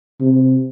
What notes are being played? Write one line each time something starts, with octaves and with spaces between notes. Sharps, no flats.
C3